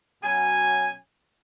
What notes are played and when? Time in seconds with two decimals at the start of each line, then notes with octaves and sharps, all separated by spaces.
0.23 B2 F#3 C#4 G#5